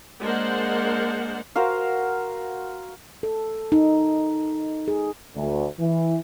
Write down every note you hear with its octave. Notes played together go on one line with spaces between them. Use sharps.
G#3 A#3 D4 A#4 C5 F#5
F#4 A#4 C5 F5
A4
D#4
G#4
D2
E3